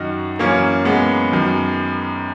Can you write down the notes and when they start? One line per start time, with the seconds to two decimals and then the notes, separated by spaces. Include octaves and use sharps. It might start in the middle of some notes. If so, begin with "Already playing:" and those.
Already playing: F#2 D#3 D#4 F#4
0.39 F#2 E3 A#3 C#4
0.85 G#3 B3
1.32 F#2 D#3